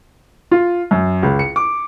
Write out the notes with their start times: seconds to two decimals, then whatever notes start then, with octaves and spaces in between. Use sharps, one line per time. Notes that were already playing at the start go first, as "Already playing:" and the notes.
0.51 F4
0.91 F#2
1.23 C#2
1.39 C#7
1.56 D6